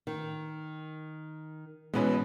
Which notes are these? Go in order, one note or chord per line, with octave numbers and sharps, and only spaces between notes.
D#3
B2 E3 G#3 B3 C#4 B4